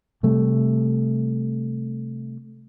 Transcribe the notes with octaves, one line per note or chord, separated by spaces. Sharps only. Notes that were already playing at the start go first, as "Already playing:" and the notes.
C3 G3 A3